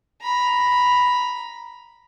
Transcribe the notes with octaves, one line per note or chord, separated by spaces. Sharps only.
A#5 B5